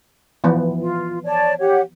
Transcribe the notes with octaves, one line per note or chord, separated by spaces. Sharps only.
E3 F3 B3
F4
C#5 D5 A5
G4 C#5 F#5